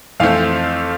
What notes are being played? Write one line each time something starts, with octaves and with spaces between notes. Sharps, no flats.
F2 E3 A3 C4 F5